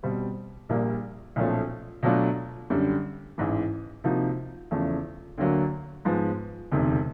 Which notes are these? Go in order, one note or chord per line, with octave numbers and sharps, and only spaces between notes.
B2 G3 C4
A#1 A#2 G3 A#3
B1 A#2 F3 A3 C#4
B2 F#3 A3 D4 F4
F#2 D3 G3
A1 G#2 E3
C3 F3 A#3 D#4 F#4
E2 C#3 F3 A3
D2 D3 F#3 A#3
G#2 F3 G#3 B3
E1 D2 C3 D#3